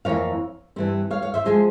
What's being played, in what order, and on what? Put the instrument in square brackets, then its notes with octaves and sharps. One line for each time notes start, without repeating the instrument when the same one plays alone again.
[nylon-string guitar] F2 E3 A#3 C#5 F5
G2 E3 G3 C4
C#5 F5
C#5 F5
C5 E5
F3 G#3 G#4 C5